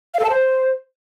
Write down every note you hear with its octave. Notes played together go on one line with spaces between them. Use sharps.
F5
A4
A5
C5